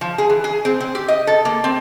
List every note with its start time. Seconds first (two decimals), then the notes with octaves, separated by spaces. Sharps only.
0.01 F3
0.18 G#4
0.30 E3
0.44 G#4
0.65 C4
0.80 C4
0.95 G4
1.08 D#5
1.27 A4
1.45 A#3
1.64 C4